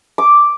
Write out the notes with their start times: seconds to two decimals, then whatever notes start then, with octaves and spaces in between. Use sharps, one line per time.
0.18 D6